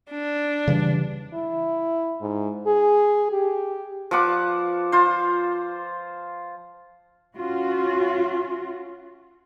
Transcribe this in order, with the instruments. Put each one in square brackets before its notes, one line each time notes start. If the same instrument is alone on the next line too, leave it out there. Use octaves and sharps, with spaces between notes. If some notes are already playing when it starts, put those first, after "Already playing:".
[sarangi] D4
[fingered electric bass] C#3 E3 G3
[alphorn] E4
G#2
G#4
G4
[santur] F3 B4 F#5 D6
F4 C5
[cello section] C#4 F4 F#4